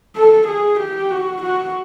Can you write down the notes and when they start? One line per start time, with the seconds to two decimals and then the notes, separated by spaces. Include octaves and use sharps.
0.16 A4
0.48 G#4
0.80 G4
1.11 F#4
1.43 F#4